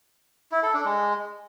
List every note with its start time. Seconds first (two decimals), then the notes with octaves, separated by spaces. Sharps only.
0.52 E4
0.63 A4
0.74 D4
0.85 G#3